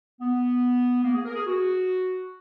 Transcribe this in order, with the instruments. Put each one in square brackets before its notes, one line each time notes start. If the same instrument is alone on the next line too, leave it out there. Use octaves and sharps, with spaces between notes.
[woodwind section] B3
A#3
G#4
A#4
G#4
F#4